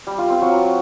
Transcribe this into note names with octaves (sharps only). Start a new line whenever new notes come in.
G3
F4
C4
F#3